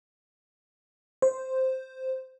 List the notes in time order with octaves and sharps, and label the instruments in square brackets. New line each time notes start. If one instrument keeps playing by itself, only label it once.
[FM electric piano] C5